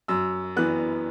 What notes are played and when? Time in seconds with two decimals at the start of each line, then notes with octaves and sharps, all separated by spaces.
0.08 F#2 E6
0.56 E3 B3 F#6